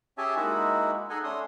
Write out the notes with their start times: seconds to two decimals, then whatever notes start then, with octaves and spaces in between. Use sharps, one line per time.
0.18 C#4 G4 G#4 E5 G#5 A5
0.37 G#3 A#3 D#4 E4 F#4
1.10 D#4 G#4 A4 D#5 F#5 G#5
1.24 A3 C#4 D4 C6 D#6